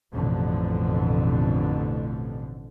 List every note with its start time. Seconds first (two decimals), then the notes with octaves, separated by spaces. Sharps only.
0.12 A1 F2 B2 D3 A3